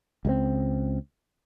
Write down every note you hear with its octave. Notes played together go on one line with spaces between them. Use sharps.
C#2 G3 C4